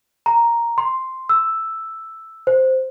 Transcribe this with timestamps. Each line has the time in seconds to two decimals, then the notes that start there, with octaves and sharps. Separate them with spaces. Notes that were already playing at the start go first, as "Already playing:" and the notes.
0.26 A#5
0.78 C6
1.29 E6
2.47 C5